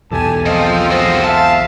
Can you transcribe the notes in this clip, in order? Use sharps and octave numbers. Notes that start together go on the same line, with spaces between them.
B1 E2 G4 A4 G#5 A5
F3 C4 F4 G#4 D#5
G#3 F#4 C5 D#6
E5 F5 A5